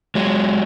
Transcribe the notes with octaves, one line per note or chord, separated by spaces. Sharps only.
F#3 G#3